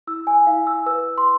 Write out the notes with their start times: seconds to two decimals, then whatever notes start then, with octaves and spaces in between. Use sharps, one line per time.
0.07 E4 E6
0.27 G#5
0.47 E4 F5
0.67 E6
0.86 B4 E6
1.18 C6